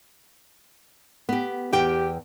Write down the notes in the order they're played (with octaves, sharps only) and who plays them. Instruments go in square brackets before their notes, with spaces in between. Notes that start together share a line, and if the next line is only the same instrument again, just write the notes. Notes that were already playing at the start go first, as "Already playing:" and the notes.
[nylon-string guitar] B3 G4
[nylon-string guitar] E2 G5 [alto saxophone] G4